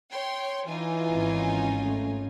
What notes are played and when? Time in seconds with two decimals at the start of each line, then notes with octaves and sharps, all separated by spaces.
0.11 C#5 G5 C6
0.67 E3 D#4 F4 G#5
1.10 G#1 C#4
1.82 A3